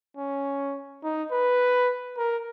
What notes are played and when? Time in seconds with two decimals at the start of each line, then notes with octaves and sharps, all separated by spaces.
0.17 C#4
1.03 D#4
1.31 B4
2.17 A#4